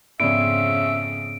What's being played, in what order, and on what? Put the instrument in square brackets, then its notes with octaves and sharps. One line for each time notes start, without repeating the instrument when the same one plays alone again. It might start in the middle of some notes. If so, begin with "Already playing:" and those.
[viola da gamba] F2 C#3 [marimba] G#2 B3 D5 [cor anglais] E5 [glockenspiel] D7